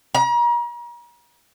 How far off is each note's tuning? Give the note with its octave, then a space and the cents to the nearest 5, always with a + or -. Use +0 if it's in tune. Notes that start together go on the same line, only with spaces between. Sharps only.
A#5 +40